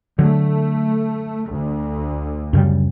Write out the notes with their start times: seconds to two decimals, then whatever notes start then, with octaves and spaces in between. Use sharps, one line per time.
0.19 D3 F#3 A3
1.49 D2
2.53 F#2 C#3 G3